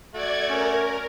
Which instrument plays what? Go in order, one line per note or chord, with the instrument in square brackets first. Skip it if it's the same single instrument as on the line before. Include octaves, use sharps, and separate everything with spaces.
[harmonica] A3 F#4 [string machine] D5 G#6
[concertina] C#4 [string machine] A#4